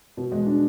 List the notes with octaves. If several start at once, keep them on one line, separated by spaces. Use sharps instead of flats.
B2
G#3
D4